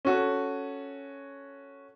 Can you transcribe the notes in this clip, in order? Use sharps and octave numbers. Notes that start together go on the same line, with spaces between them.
C#4 F#4 A4